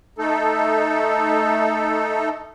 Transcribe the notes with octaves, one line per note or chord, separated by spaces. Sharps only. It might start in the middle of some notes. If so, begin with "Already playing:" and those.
A3 D#4 A4